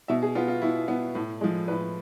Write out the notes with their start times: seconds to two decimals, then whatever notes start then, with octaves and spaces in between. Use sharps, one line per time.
0.08 B2 E5
0.22 G#4
0.35 B3 F4
0.48 F4
0.62 B2 E4
0.88 B3
1.15 A2
1.41 F3 G#3
1.68 A2 B4